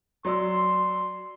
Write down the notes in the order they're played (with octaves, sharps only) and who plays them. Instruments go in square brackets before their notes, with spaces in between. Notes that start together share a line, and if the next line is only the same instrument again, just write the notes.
[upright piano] F#3 D5 E6 [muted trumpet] C6